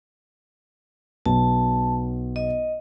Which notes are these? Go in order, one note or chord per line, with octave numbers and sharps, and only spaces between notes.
B1 A5
D#5